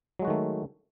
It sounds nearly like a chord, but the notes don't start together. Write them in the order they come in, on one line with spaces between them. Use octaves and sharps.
F#3 G#3 F#4 D#3 A3